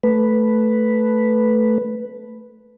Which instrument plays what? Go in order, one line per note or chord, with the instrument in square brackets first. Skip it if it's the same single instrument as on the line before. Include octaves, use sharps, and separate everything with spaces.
[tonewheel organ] A3 B4